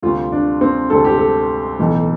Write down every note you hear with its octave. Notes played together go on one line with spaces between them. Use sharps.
D2 C3 G3 F4
D4
C4
D2 C3 G3 A4
G4
A4
B1 A2 E3